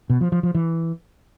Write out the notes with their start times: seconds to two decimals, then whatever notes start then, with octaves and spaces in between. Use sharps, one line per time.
0.10 B2
0.21 F3
0.32 F3
0.43 F3
0.55 E3